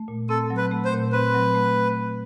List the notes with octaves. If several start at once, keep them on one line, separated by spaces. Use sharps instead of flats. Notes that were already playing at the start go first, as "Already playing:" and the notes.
Already playing: A3
A#2
C4 A4
F#3
B4
A3
C5
A#2
C4 B4
F#3
A3